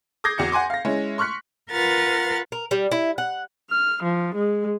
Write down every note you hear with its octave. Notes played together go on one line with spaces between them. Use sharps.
D6 D#6 G6 G#6 A#6 C7
E2 F#4 C#7
F#5 G#5 C6 D6
F5 A#6
G#3 C#4 E4
C6 C#6 F6 F#6 B6 C#7
F4 A#4 B4 F#5 F6 A6
A#4
G3
E4
F#5
F6
F3
G#3